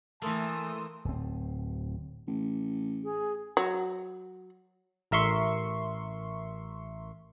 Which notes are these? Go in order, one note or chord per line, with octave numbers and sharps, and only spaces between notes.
E3 A3 A#3 A5 C6 D#6 E6
D1 C4
A1
G#4
F#3
A1 A#4 E5 C6 C#6